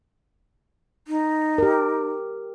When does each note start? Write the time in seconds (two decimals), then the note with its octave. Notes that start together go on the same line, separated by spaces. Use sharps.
1.08 D#4
1.58 G4 A#4